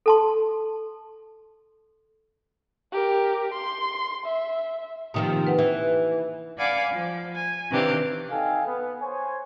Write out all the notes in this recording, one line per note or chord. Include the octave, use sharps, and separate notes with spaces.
A4 A5 C6
G4 A#4
C6
E5
C3 D#3 F3 A#3 D#4
B4 F#5
E3
D5 F5 F#5 G#5 B5 D6
F3
G#5
C3 D#3 E3 D4 G4 F5
D#4 A4 F5 G5 G#5
B3
C5 C#5 G#5